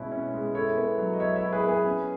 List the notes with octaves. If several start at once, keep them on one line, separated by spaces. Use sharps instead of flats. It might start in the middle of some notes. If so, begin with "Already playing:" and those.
Already playing: B2 G#3 C#4 E4 B4
C#4
G#3
E4 A4 C#5
B3
F#3
D#5
F#3 C#5 E5
C#5 E5
E4
G#4 B4
B3
G#4
C#4